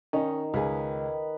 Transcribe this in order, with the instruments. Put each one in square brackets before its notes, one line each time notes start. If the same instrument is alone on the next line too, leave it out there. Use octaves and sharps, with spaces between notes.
[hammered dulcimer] D#3 [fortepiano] C#4 D#4
[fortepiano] C#2 G#4 [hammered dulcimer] B4